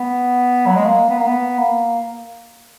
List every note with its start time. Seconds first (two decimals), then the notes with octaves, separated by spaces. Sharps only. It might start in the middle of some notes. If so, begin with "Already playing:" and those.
Already playing: B3
0.67 F#3
0.76 G#3
0.86 A#3
1.10 B3
1.18 A#3
1.27 B3
1.59 A#3